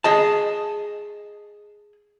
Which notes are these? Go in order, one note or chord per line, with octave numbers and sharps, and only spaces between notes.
G#4 D#5 A5